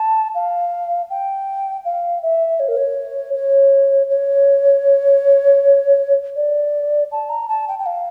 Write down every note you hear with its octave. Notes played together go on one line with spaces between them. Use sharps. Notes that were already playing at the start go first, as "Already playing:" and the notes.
Already playing: A5
F5
G5
F5
E5
C#5
A#4
C#5
C#5
C#5
D5
A5
A#5
A5
G5
G5
F5